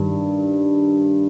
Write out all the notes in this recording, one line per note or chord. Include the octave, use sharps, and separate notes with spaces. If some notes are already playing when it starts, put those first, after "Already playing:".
Already playing: G2 D#3